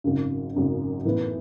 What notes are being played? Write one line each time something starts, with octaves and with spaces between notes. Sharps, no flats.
G#1 F#2 C#3
G#1 F#2 C#3
A2 E3 B3